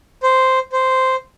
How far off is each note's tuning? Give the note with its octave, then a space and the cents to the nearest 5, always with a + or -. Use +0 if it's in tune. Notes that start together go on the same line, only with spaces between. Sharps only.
C5 -5
C5 -5